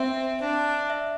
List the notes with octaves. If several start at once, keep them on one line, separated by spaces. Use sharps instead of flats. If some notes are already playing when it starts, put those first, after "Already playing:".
Already playing: C4 E5
D4
E5